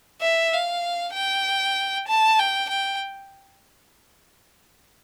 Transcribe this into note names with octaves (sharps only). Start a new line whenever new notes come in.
E5
F5
G5
A5
G5
G5